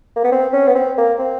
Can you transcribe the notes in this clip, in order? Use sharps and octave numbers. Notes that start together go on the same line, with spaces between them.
A#3
B3
C4
C#4
B3
C4
A#3
C4